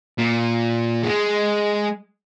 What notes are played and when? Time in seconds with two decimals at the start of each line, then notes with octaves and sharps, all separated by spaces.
0.18 A#2
1.04 G#3